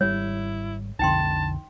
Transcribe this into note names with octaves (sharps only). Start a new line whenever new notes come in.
G#1 G3 E4 C#5
B1 F2 D3 D#4 G5 A5 C6